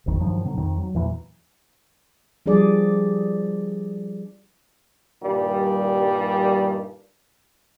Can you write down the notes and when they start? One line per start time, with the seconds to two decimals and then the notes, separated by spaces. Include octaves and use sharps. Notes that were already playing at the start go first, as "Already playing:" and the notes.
0.06 D1 G#1 F2 D#3
0.20 G2 D#3 F3 F#3
0.45 B2 D3 F#3
0.57 F2 D#3
0.77 F#3
0.94 E2 A#2 E3 F#3
2.46 F3 G3 D4 G#4 D5
5.22 G2 A#2 D#3 G3